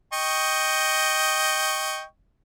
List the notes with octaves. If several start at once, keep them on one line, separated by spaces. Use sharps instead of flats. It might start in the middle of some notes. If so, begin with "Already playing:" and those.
D#5 G5 C#6